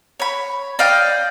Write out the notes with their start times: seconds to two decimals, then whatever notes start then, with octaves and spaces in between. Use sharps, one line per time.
0.20 C#5 B5
0.79 D5 D#5 F5 G5